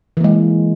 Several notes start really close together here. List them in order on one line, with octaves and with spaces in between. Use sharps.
E3 A#3 G#3